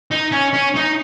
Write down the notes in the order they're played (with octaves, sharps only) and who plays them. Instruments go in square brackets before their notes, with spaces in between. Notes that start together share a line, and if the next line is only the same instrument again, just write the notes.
[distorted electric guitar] D#4
C#4
C#4
D#4